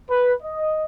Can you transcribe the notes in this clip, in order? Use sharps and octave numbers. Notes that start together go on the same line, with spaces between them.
B4
D#5